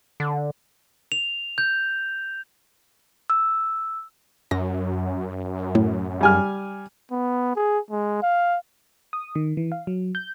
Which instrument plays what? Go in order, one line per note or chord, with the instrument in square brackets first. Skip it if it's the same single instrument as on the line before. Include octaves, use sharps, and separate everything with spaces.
[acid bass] D3
[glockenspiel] F7
G6
[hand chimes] E6
[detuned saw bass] F#2 [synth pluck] A#6
[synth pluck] A2
[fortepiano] G3 G#5 F6
[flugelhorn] B3
G#4
G#3
F5
[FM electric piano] D#6
D#3
E3
F5
F#3
G6